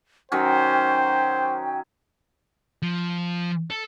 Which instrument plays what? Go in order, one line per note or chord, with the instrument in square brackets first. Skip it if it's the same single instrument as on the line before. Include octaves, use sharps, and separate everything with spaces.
[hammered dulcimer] D#3 F#3 C#4 [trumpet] C5 [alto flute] G5
[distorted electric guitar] F3
A4